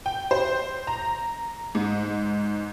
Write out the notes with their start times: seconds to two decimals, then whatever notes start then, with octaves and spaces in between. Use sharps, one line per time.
0.06 G5
0.31 C5
0.87 A#5
1.75 G#2